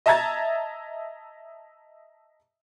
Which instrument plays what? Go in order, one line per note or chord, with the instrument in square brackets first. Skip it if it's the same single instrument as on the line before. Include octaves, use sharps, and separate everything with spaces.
[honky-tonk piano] D#5 E5 A5 A#5 G#6 A6